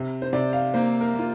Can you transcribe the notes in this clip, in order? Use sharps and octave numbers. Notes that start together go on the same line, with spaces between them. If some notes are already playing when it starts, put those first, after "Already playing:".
Already playing: C3
C5
C3 D5
F5
A#3 C5
A#4
A#3 F4